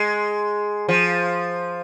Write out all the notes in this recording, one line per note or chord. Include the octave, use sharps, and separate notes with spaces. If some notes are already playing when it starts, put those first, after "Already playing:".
Already playing: G#3
F3